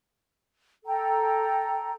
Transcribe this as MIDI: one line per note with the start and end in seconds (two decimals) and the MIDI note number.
0.86 1.94 69
0.86 1.94 79
0.86 1.94 82